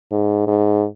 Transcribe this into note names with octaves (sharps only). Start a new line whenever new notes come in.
G#2
G#2